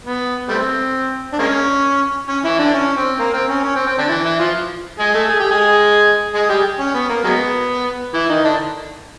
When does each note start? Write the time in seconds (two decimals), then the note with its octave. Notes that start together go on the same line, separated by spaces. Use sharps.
0.04 B3
0.49 G3 A3 C4
1.33 D4
1.39 G#3 A#3 C#4
2.29 C#4
2.44 E3 E4
2.59 D3 D4
2.74 C#4
2.97 C4
3.19 A#3
3.34 C4
3.49 C#4
3.64 C#4
3.76 C4
3.87 C4
3.98 D3 D4
4.09 E3 E4
4.24 E3 E4
4.39 F3 F4
4.99 G#3 G#4
5.14 A3 A4
5.29 G#4
5.40 G4
5.50 G#3 G#4
6.34 G#3 G#4
6.49 G3 G4
6.79 C#4
6.94 B3
7.10 A#3
7.24 F#3 G#3 B3
8.14 E3 E4
8.29 D#3 D#4
8.44 D3 D4